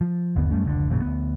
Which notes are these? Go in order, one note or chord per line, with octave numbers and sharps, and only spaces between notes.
F3
G1 D#2 D3 B3
F#2 G3 A3 C#4
F1 C#2 A2 D3
G#1 F2 A#2 C#3
D2 B3